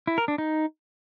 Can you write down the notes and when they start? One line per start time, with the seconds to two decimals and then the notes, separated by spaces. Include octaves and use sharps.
0.07 E4
0.18 A#4
0.28 D4
0.38 D#4